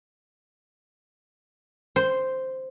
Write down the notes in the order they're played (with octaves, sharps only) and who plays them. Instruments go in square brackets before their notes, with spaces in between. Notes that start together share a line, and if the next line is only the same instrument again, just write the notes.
[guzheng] C5